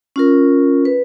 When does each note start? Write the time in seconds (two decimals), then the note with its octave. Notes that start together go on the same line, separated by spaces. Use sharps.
0.16 C#4 F4 A#4
0.85 B4